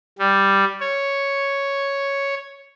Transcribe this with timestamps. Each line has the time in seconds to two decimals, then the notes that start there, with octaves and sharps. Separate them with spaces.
0.19 G3
0.80 C#5